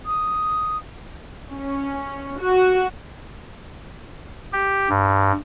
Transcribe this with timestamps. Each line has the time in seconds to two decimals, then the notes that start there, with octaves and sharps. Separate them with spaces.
0.06 D#6
1.53 C#4
2.40 F#4
4.53 G4
4.90 G2